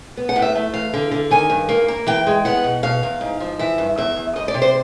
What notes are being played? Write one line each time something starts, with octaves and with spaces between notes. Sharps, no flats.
B3
F#5
A2
E5
A3
E3 F5
D3
D3
D#3 G#5
G2
A#3
A#3
E3 G5
G#3
B3 F#5
B2
B2 F5
E2
G#2
F3
E3 E5
G2
E2 E5
E2
D2 D#5
D5
C3
C5